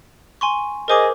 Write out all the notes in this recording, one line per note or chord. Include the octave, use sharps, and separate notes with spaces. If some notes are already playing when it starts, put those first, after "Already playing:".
G#5 C6 C#6
G#4 A#4 C5 D#5 D6